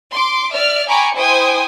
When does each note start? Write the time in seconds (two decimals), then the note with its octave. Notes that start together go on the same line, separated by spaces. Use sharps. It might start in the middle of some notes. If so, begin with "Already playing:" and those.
0.11 C6 D6
0.53 D5 E5 F6
0.87 G5 G#5 A#5 B5 C#6 D6
1.16 E4 C5 G5 G#5 D#6